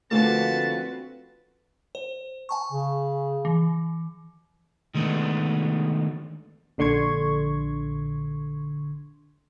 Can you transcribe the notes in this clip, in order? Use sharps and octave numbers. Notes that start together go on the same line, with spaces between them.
D3 F3 A3 A#3 C4 F#4 B4 A5
C5
G#5 A5 C#6
C#3
E3
D#3 G#3 A3 B3 D4
A#1 D3 C6 C#6 G#6